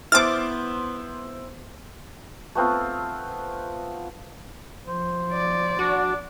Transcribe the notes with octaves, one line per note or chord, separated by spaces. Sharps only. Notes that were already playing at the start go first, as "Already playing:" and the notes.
B3 E4 C5 C6 D6 F6 A6
A3 B3 C4 F4
F3 C5
D5
D4 F#4